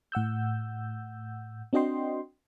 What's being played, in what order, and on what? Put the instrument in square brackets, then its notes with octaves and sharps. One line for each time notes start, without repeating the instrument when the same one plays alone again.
[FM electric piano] A2 F#5 E6 G6
C4 D4 F#4 D#5 G5 C6